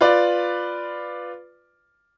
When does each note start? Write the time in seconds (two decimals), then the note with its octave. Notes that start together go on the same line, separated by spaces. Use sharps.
0.01 F4 B4 D5